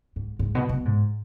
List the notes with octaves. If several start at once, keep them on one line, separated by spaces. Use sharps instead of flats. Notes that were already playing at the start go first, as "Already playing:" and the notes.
G#2
G#2
B2
B2
G#2